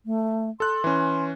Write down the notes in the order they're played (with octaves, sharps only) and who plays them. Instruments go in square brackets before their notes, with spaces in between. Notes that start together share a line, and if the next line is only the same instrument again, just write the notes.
[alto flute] A3
[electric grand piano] A4 F#6 [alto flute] C6
[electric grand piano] E3 C#4